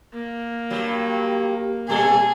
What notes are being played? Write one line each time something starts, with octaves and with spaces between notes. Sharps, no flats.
A#3
G2 F#3 G3
A#2 G3 G#4 A4